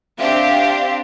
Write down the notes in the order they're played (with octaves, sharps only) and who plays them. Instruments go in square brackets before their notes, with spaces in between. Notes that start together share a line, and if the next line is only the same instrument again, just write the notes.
[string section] C4 D4 G4 [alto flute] E5 [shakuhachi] F5